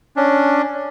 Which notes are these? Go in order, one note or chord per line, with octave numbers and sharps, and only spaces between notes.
C#4 D4